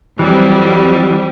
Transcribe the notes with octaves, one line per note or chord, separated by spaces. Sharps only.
F2 E3 F#3 G3